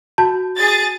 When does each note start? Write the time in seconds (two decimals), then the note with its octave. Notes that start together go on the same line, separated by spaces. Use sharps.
0.18 F#4 A5 G6
0.57 G#4 A6